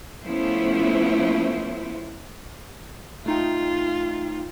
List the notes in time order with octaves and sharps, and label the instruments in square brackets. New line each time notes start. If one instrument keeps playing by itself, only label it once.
[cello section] F3 A3 B3 C#4 E4 C5
[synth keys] A3 D#4 G5 [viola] F4